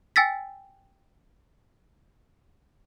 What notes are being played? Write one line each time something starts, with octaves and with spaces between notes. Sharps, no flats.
G5 G#5 E6 A6 B6